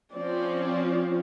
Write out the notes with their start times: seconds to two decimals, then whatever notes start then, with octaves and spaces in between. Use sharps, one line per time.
0.15 F3 C4 C#4 D5